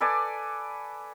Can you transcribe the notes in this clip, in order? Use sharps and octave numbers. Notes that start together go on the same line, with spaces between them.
A4 B4 D5 G#5